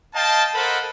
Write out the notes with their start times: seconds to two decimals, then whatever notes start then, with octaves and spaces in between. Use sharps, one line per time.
0.15 D#5 F5 G5 A5
0.55 A4 A#4 C5 D#5 F#5 B5